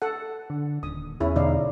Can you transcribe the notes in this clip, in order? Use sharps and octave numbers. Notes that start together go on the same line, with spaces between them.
A4 F#5
D3
D#1 D#6
E2 C#4 E4 G#4
B2 D3 D#4 D5 F5